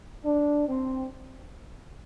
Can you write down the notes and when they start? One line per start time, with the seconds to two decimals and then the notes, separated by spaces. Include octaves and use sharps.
0.24 D4
0.67 C4